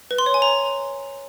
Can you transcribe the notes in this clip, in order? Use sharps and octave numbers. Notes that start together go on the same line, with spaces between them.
B4
C6
C#5
G#5
A#5